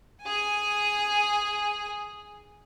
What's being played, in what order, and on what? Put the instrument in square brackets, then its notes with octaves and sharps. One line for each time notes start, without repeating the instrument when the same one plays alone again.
[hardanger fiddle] G#4 G#5